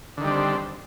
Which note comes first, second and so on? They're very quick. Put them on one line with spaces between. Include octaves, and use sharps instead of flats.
D3 D#3 G3 D4 C4